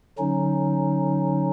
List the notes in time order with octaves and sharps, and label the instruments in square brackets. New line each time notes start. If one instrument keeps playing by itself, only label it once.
[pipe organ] D3 F#3 C#4 D#4